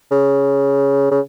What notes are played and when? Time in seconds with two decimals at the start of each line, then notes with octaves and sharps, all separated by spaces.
0.12 C#3
1.11 C#3